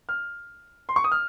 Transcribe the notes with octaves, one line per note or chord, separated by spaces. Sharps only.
F6
C6
C#6
D#6
F6